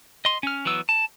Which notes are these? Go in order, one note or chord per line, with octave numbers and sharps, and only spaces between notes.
D#5 C6
C#4 F6
E3 F#3 B3 E6
A5